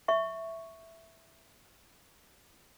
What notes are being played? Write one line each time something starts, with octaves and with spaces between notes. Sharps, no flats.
E5 C#6